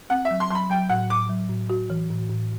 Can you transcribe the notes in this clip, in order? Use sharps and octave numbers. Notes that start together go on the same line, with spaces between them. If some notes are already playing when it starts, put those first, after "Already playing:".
C4 F#5
E5
F#3
C6
F#3 B5 C6
F#3 G5
A2 F#5
A2 D6
F#3
A2
F#4
E3
A2
A2